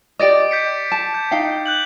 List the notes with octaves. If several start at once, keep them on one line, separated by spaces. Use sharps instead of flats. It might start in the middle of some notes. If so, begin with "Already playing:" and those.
G4 D5 D#5 D6 A6 D7
G6 B6 C#7
A5
G6
D#4 F5 G5
F#6 G6 F#7